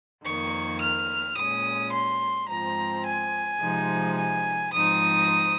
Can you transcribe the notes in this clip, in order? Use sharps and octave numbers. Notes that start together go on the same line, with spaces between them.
F2 D#3 A#3 C#6
F6
A#2 G#3 C#4 D#6
C6
G#2 F3 C4 A#5
G#5
C3 F3 G#3 D#4
G#5
G#2 F3 C4 D#4 D#6